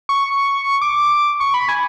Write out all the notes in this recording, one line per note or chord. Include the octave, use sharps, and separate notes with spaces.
C#6
D6
C#6
B5
G#5